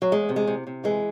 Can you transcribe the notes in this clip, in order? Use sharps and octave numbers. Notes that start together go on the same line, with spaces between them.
F#3
E2 G#3
C3
G#3
C3
C3
E3 G#3